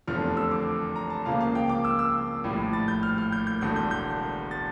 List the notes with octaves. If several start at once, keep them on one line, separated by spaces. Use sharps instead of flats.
F1 E2 D3 F3 A3 F6
E6
D6
A#5
A5
C#2 C#3 F3 A#3 F5
F5
G5
D6
E6
E6
A#1 A2 G3
A6
G6
F6
F6
G6
G6
E1 E2 D3 G6
G6
G6
A6